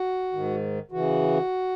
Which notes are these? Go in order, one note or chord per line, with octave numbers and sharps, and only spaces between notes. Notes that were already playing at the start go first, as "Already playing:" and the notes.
Already playing: F#4
G#2 D#3
C#3 E3 F#4